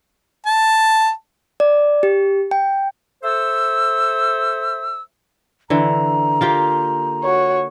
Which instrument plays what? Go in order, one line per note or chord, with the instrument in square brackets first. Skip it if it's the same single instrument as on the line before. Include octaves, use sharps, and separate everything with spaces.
[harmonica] A5
[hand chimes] D5
G4
G5
[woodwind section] A4 C5 E5 E6
[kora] D3 E3 [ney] A#5
[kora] A#3 F4 G4
[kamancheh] F#4 C#5